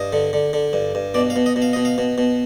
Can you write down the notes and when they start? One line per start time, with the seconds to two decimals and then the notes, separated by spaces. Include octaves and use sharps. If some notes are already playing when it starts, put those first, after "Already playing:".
Already playing: G2 D#5
0.13 D3
0.33 D3
0.53 D3
0.73 G2
0.95 G2
1.14 B2 D5
1.30 F5
1.36 B2
1.46 D#5
1.56 B2
1.62 F5
1.73 B2 D#5
1.85 F5
1.98 B2
2.18 B2